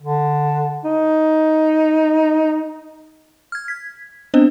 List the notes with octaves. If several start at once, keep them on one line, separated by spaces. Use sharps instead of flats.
D3
D#4
F6 G#6
G#6 B6
B3 C4 D4 C5 D#5